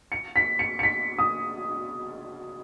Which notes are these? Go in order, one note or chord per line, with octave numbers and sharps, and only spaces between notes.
C#7
B6
C#7
C#7
B6
D#6